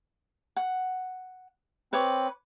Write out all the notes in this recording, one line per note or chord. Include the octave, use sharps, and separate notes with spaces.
F#5
C4 B4 C#5 D6